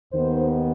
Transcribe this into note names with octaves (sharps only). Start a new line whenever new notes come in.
D#2 D#3 B3 C5